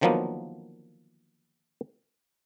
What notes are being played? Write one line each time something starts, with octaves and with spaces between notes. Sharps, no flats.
D3 D#3 F3 F#3 A#3 B3